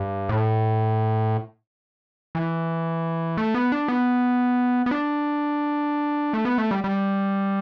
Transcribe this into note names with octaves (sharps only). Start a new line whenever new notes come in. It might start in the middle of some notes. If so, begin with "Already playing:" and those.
Already playing: G2
A2
E3
A3
B3
D4
B3
B3
D4
A3
B3
A3
G3
G3